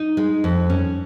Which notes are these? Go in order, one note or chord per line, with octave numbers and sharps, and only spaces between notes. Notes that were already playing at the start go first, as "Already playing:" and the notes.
Already playing: D#4
G#3
F2
C#4